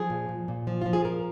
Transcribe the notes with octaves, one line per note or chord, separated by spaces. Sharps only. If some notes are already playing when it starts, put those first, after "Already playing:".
Already playing: F3 G#4
A#2
A#2
A#2
F3
F3 F4
G#4
A#2 A#4